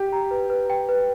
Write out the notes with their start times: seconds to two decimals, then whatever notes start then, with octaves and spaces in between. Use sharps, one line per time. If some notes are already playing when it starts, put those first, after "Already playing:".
Already playing: G4
0.12 A#5
0.31 B4
0.50 B4
0.70 G5
0.89 B4